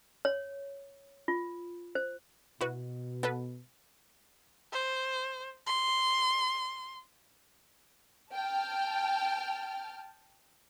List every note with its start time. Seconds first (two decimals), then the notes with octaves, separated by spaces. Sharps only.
0.25 C#5
1.28 F4
1.95 C5
2.61 B2 E4 F#4 B4
3.23 B3 A4 B4
4.73 C5
5.67 C6
8.33 G5 A5 F6